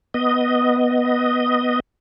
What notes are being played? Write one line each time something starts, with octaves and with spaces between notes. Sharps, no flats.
B3 D#5